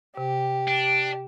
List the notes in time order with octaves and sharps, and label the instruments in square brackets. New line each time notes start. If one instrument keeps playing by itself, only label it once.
[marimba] C3 [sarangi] G4
[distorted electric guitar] D4